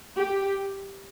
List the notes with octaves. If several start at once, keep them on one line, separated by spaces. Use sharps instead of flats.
G4